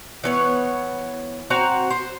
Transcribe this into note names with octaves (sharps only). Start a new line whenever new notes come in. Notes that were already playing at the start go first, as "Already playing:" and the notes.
E3 B3 C#5
C4 F#4 A#5
C5